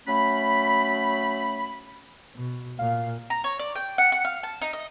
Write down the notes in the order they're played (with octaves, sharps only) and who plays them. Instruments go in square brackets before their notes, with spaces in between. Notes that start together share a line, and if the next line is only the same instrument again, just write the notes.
[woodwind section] F#3 A3 C#4 B5
[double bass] B2
[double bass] A#2 [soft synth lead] F5
[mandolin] A#5
C#5
D5
G5
F#5
F#5
F5
A5
D#4
D#5